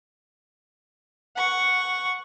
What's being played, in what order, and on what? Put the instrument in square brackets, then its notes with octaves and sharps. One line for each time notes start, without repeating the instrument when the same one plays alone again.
[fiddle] F#5 C#6